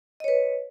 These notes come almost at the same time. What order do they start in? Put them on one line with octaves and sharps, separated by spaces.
D#5 C#5 B4